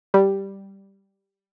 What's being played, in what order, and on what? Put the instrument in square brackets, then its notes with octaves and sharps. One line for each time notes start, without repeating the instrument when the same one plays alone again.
[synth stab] G3